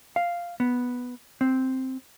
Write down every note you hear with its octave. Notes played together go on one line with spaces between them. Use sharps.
F5
B3
C4